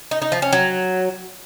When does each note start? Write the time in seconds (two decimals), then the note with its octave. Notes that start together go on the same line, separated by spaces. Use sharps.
0.11 D#4
0.22 D#4
0.32 F3
0.42 C#4
0.53 F#3